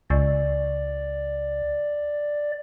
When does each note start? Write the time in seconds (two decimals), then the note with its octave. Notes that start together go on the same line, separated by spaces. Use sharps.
0.10 C#2 D5